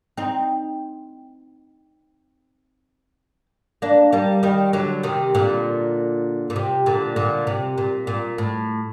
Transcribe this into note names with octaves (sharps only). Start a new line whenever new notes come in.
C4 D#4
A#3 D4
G3 A#3
D#3 G3
D3 F#3
C3 D#3
A#2 D3
A#2
C3
A#2 D3
A#2 D3
C3
A#2
A#2
A2